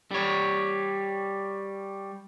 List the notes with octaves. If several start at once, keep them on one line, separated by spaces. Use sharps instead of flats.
G3 C#5